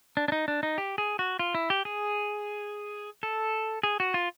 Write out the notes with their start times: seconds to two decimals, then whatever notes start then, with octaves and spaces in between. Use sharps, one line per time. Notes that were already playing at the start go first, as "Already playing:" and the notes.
0.17 D4
0.28 D4
0.32 D#4
0.48 D4
0.63 D#4
0.78 G4
0.98 G#4
1.19 F#4
1.39 F4
1.55 E4
1.70 G4
1.85 G#4
3.23 A4
3.83 G#4
4.00 F#4
4.14 F4